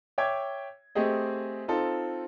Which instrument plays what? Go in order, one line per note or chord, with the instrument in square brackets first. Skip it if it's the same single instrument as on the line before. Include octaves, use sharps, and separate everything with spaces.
[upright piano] C#5 E5 G5 D6 G#6
A3 C4 G4 G#4 D#5
C4 D#4 F4 A4